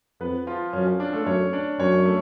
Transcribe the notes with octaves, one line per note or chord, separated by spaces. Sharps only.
F2 B3 B4
F3 F4
F#2 C#4
C#4
D4
A3 A4
F#2 C#4 C#5
D4 D5
F#2 C#4 C#5
A3